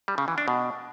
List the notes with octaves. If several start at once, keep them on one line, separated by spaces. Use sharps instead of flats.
G3
C#3
E3
D4
B2